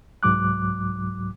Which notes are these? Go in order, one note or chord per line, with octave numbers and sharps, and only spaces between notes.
C2 G#2 F#3 D6 F#6